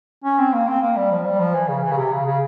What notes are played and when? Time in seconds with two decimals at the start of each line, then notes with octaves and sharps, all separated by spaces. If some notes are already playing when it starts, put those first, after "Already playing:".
0.24 C#4
0.39 C4
0.53 A#3
0.68 C4
0.82 A#3
0.97 G3
1.11 F3
1.25 G3
1.40 F3
1.54 E3
1.68 C#3
1.83 E3
1.91 C#3
1.97 C3
2.12 C#3
2.26 C#3